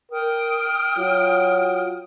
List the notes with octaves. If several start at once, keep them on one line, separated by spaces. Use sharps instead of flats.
A#4 G5 D#6 F6
F#3 F4